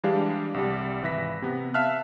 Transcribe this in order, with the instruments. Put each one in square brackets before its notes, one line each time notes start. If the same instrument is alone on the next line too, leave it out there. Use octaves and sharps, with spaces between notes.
[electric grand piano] E3 G3 G#3 D4 G4 F5
C2 G3
G#1 E3 B4 E5 A#6 B6
C3 B3
E5 F5 A5 F6 F#6